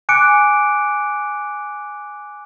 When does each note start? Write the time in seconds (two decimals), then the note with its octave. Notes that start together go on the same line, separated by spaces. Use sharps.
0.09 G#5 D6 F#6 C#7 D7